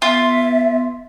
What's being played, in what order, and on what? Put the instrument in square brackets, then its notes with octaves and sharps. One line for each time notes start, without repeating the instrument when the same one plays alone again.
[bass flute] B3 [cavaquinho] F4 [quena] E5